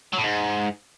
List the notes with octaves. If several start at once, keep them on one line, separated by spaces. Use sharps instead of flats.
F#3
A2
G#2